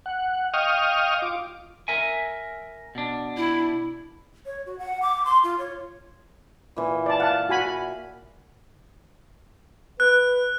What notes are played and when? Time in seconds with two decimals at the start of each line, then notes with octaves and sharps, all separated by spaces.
0.06 F#5
0.54 D#5 F5 G5 C#6 D#6 F6
1.22 F4 D6
1.88 A#4 E5 G#5
2.95 B2 D4
3.37 E4
4.46 C#5
4.66 F#4
4.78 F#5
5.02 D6
5.25 C6
5.44 F4
5.59 C#5
6.76 A#2 E3
7.06 D5 A5
7.20 F5 F#5 A5
7.49 F#4 G#5 B5
10.00 B4 F#6